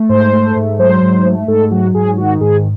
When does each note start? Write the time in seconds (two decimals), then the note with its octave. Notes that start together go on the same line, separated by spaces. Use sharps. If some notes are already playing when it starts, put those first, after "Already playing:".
Already playing: A3
0.09 G#2 C5
0.33 A3
0.56 G#2
0.78 F#3 C5
1.02 G#2
1.25 A3
1.48 G#2 A4
1.71 F#3 F#4
1.94 G#2 G#4
2.18 D#3 F#4
2.41 G#2 G#4